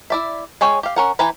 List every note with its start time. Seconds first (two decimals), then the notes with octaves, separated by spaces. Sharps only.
0.10 E4 D5 E5
0.61 G#3 G#4 C#5 G5
0.83 G4 F5
0.96 C#4 A#4 F#5
1.19 E3 B4 G5 G#5 A#5